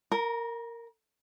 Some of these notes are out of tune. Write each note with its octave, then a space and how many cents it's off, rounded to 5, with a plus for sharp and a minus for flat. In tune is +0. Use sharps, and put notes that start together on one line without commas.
A#4 -10 A#5 +40